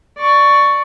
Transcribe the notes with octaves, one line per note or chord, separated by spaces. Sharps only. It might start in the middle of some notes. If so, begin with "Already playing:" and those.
D5 C#6